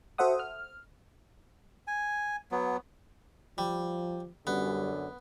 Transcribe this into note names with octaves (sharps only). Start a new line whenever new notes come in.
F#4 A4 C5 E5 F#5 D#6
F6
G#5
F#3 B3
F3 G3
F#2 D3 G3 B3